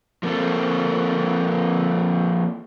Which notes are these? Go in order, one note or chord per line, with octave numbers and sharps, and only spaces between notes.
F3 A#3 C4 A4